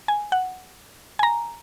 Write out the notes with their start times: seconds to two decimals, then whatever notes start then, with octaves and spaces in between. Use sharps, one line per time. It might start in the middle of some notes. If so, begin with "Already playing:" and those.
0.08 G#5
0.32 F#5
1.19 G#5
1.23 A#5